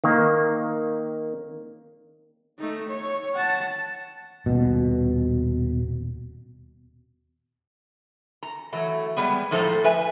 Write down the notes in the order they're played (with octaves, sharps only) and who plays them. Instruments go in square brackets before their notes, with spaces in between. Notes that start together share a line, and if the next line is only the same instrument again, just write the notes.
[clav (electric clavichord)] D#3 A#3
[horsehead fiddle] A3 D#4
C#5
F#5 A5
[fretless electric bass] D#1 B2
[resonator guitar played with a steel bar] A#5
E3 F#3 A3
G3 G#3 B3
A2 F3 A3 A4 C5 A#5
B4 E5 G#5